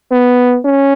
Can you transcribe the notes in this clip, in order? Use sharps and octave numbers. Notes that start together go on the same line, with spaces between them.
B3
C#4